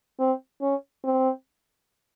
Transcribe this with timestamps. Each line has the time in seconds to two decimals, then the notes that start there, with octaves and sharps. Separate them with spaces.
0.19 C4
0.62 C#4
1.04 C4